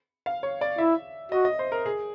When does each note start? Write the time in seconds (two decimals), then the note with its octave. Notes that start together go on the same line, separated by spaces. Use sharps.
0.26 F5
0.43 C#5
0.61 D5
0.78 E4 E5
1.32 F#4 D#5
1.45 D#5
1.59 C5
1.72 A#4
1.86 G#4